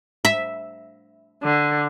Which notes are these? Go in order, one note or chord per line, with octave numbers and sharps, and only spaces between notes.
E5
D3